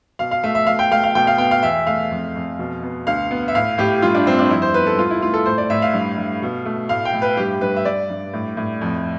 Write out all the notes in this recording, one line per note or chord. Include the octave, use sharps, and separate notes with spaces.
B2 F5
F5
A3 E5
E5
B2 F5
G5
A3 F5
F5
B2 G5
F5
B3 G5
F5
E2 E5
A3 F5
F2
F2
B2
B3
D2 F5
B3
E5
A2 F5
A2 G4
G2 F4
D4
G2 C4
D4
F2 E4
C5
B3 B4
A4
C2 F4
E4
A3 F4
A4
A2 C5
D5
A2 E5
F5
G2
G2
B2
A3
A2 F5
G5
A2
B4
G2 G4
G2 B4
E5
G2 D5
G2
A2
A2
F2